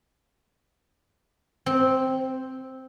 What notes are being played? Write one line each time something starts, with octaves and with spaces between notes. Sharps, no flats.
C4